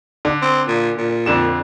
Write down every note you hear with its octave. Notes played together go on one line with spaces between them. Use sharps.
D3
C4
A#2
A#2
F2 D3 E7